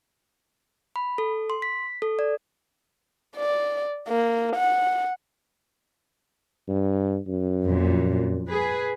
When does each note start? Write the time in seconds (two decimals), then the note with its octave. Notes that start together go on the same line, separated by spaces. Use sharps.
0.96 B5
1.18 A4
1.50 C6
1.62 B6
2.02 A4
2.19 D5
3.37 D5
4.08 A#3
4.56 F#5
6.68 G2
7.27 F#2
7.63 F2 A#2
8.49 G#4 B4